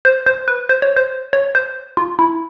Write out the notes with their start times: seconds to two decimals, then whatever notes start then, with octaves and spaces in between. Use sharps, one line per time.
0.05 C5
0.26 C5
0.48 B4
0.69 C5
0.82 C#5
0.96 C5
1.33 C#5
1.55 C5
1.97 F4
2.19 E4